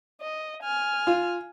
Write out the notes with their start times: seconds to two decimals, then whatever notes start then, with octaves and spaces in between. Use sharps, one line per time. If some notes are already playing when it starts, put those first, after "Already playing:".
0.21 D#5
0.63 G#5 F6
1.07 F4